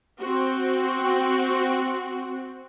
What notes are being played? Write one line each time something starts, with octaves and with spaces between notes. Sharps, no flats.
C4 F#4